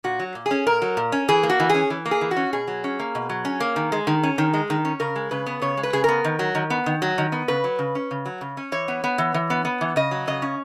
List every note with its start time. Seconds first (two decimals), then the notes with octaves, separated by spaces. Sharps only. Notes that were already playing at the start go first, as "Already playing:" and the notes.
0.04 A#2 F#4
0.20 F#3
0.35 A#2
0.46 G#4
0.51 C#4
0.67 A#2 A#4
0.82 F#3
0.97 A#2
1.12 C#4
1.28 E3 G#4
1.43 A#3
1.50 F#4
1.60 E3
1.70 C#4 G#4
1.90 E3
2.06 A#3
2.11 G#4
2.21 E3
2.31 F#4
2.36 C#4
2.53 B2 G#4
2.68 F#3
2.84 C#4
2.99 A#3
3.15 B2
3.29 F#3
3.45 C#4
3.60 A#3
3.76 D#3
3.92 G#3
4.07 D#3
4.23 C#4
4.38 D#3
4.54 G#3
4.70 D#3
4.85 C#4
5.00 C#3 A#4
5.16 G#3
5.31 C#3 B4
5.46 B3
5.62 C#3 C#5
5.77 G#3
5.83 B4
5.93 C#3 G#4
6.04 B3 A#4
6.24 D#3
6.39 F#3
6.55 D#3
6.70 B3
6.86 D#3
7.02 F#3
7.18 D#3
7.32 B3
7.48 C#3 B4
7.64 F#3
7.79 C#3
7.95 C#4
8.11 C#3
8.26 F#3
8.41 C#3
8.57 C#4
8.72 E3 C#5
8.88 B3
9.04 B3
9.18 E3
9.34 E3
9.50 B3
9.65 B3
9.81 E3
9.96 C#3 D#5
10.11 F#3
10.27 C#3 D#5
10.42 C#4